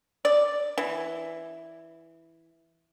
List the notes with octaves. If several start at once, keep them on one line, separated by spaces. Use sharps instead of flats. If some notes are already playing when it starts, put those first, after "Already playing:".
D5
E3